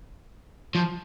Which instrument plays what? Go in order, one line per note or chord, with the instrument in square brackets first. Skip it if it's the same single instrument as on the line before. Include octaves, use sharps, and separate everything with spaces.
[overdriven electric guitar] F3